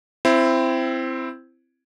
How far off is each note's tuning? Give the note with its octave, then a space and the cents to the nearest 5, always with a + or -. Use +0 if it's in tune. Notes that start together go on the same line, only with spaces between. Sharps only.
C4 +0 E4 +20